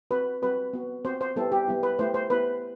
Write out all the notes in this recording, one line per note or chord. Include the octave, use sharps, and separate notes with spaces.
C4 F#4 B4
G3 C4 F#4 B4
B3 F#4
C4 F#4 C5
C5
G3 B3 E4 G4 A4
G4
G3 B3 E4
B4
A3 E4 G4 C5
C5
B3 E4 G4 B4